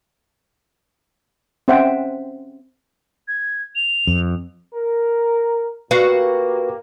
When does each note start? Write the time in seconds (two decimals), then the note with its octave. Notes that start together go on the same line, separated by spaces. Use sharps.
1.68 C4 C#4 C5 E5 F#5 G5
3.28 G#6
3.76 F7
4.07 F2
4.74 A#4
5.91 A#2 A#3 F#4 G4 B4 F5